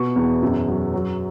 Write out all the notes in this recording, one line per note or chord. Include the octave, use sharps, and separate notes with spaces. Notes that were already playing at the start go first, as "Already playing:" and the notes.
Already playing: B2 B3 C#6
E2
F#2
F#3
F#3